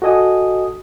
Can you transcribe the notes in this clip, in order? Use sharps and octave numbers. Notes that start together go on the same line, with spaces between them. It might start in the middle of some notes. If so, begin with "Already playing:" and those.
F#4 A4 D#5 G#5 D#6